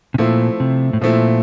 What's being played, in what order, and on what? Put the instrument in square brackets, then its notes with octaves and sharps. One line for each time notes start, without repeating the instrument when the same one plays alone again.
[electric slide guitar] C3
[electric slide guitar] A#2 [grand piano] F3 A3 C4 E4
[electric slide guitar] C3
A2
[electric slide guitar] A#2 [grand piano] F3 A3 C4 E4